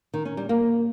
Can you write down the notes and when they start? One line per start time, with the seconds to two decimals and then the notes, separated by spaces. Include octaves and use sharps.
0.14 D#3
0.25 C#4
0.37 G3
0.49 A#3